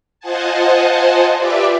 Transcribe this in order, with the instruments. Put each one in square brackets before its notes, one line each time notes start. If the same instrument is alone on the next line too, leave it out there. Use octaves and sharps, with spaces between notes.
[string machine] F4 C5 D#5 F#5 G#5 A5
F4 G4 B4 D5 E5 D6